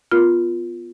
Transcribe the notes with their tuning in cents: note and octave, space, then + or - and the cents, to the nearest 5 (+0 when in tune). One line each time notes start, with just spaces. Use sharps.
B3 +0 F4 +0 A#4 +40